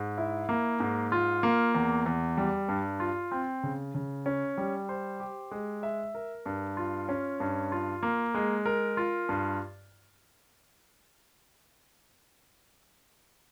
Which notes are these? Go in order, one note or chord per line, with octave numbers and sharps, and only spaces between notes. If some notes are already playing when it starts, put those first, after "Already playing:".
Already playing: G#2
E4
A#3
G#2
F4
A#3
E2
E2
G3
G2
F4
C4
C#3
C#3
C#4
G3
C5
G4
G#3
E5
A#4
G2
F4
C#4
G2
F4
A#3
G#3
A#4
F4
G2